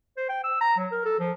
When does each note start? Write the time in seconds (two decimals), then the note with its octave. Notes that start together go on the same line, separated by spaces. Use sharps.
0.17 C5
0.29 G5
0.44 E6
0.61 A#5
0.77 F#3
0.92 A#4
1.05 A4
1.19 F3